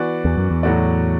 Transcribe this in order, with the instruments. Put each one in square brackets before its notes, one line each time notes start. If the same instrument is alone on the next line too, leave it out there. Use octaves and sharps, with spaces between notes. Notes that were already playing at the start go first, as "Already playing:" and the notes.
Already playing: [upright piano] E3 B3 F#4 D5
[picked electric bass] E2
F#2
E2
[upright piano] A2 F#3 A3 F#4 D5